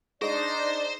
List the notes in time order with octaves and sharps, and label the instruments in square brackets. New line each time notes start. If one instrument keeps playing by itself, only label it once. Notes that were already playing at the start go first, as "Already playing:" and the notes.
[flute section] D4 D5 [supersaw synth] D#4 A#6 [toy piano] G#4 [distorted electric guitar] C5